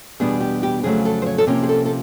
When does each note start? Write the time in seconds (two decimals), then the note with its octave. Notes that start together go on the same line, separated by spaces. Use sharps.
0.20 E2 B2 G3 B3 D4 G#4
0.41 G4
0.63 G4
0.83 F2 C#3 F#3 A3 G#4
1.05 A4
1.22 C5
1.26 C#5
1.38 A4
1.47 C3 F3 A#3 C#4 A#4
1.63 G#4
1.69 A4
1.85 A4